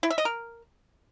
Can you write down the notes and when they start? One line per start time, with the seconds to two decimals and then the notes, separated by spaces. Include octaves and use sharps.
0.03 E4
0.10 E5
0.18 D#5
0.25 A#4